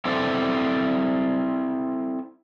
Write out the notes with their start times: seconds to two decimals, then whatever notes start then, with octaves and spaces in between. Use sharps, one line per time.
0.05 C4 E4 A4 C5 D5